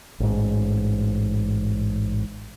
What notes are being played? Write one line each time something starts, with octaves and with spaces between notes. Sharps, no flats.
A1 G#2